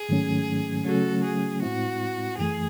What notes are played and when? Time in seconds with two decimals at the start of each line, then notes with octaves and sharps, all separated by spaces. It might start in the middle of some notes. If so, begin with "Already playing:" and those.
Already playing: G#4
0.09 G#2 D#3 F#3 A3 C#4
0.85 C#3 F#3 A3 C#4 F#4 A4
1.23 G#4
1.62 A2 G#3 C4 E4 F#4
2.38 F#2 E3 A3 G#4